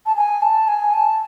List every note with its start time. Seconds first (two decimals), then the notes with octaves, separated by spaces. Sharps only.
0.06 A5
0.16 G#5
0.42 A5
0.68 G#5
0.93 A5